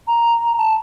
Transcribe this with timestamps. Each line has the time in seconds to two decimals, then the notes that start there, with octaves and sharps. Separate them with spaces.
0.07 A#5
0.58 A5